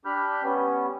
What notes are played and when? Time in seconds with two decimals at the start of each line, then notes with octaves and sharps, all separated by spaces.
0.05 D4 G4 B5 F6 G6
0.43 G3 B3 C#4